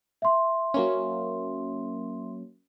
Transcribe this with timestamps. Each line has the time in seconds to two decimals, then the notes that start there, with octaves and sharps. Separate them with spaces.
0.22 E5 C6
0.74 F#3 A#3 C#4